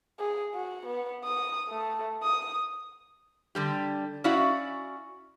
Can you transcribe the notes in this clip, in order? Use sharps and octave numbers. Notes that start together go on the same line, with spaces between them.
G#4
F#4
B3
D#6
A3
D#6
D3 G3 G4
C#4 E4 F#4 D5 F5 F#5